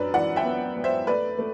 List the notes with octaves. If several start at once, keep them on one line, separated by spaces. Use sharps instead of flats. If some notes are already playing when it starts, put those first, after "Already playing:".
Already playing: F#2 D4 B4 D5
E3 D5 F#5
E5 G5
B3
B3
C5 E5
A3 B4 D5
A3